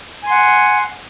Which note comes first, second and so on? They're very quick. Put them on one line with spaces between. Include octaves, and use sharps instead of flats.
G#5 C6 F#5